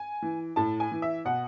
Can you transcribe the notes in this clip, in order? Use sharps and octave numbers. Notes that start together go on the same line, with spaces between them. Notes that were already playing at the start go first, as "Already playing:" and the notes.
Already playing: G#5
E3
A2 A5
G#5
E3
E5
B2 F#5